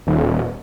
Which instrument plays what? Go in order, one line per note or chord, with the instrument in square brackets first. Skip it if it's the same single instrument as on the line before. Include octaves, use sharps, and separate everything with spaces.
[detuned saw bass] D#1